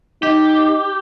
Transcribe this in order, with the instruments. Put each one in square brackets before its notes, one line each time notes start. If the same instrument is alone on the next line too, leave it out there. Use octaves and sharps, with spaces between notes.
[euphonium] D#4 [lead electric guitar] G4